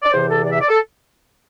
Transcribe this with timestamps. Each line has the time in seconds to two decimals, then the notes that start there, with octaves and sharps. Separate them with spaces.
0.03 D5
0.11 E2 C3 E3 C5
0.28 A4
0.43 D5
0.52 E5
0.60 D5
0.69 A4